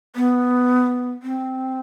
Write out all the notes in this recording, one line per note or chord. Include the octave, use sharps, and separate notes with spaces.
B3
C4